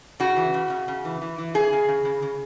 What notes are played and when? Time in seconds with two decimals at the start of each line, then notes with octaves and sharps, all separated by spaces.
0.20 C#3 F#4
0.36 E3
0.54 C#3
0.70 C#3
0.88 C#3
1.05 E3
1.22 E3
1.38 E3
1.54 C#3 G#4
1.72 C#3
1.88 C#3
2.05 C#3
2.23 C#3